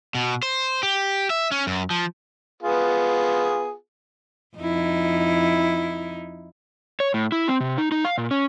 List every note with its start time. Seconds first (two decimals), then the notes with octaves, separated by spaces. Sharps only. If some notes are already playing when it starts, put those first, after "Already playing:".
0.15 B2
0.43 C5
0.83 G4
1.30 E5
1.51 C#4
1.67 F#2
1.90 F3
2.62 B3 F4 G#4
4.57 F2 D#4 E4
7.00 C#5
7.14 A2
7.32 E4
7.48 C4
7.60 C3
7.78 D#4
7.92 D#4
8.05 F5
8.18 A#2
8.31 C#4